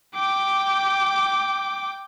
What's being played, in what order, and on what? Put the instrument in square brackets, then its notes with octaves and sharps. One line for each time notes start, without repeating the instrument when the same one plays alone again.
[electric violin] G5 D6